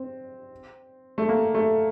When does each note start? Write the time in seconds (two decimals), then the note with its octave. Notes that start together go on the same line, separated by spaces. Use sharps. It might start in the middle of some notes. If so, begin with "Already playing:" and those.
Already playing: C4
1.18 A3
1.29 A#3
1.55 A3